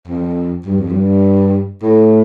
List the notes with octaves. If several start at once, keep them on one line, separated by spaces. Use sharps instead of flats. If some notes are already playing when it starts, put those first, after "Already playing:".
F2
G2
F2
G2
A2